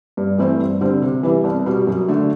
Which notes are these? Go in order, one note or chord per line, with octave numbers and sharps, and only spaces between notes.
G2
E3 A3 C4 E4
G2
D3 G3 C4
C3
E3 G3 B3 E4
C2
B2 G3
F#2
D3 A3